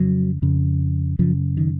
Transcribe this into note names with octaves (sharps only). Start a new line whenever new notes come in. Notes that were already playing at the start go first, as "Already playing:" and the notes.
Already playing: F2 C#3 F#3
F2 C#3
F#2 C#3 F3
D#3